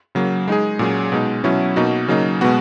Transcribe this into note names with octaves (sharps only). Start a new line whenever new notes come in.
C#3 F#3 A#3
G#3 D#4 G#4
A#2 F#3 C#4 G#4
B2 G#3 D#4
B2 F#3 C#4 E4
B2 A#3 D#4 F#4
C#3 F#3 A#3 D#4
B2 G#3 B3 F#4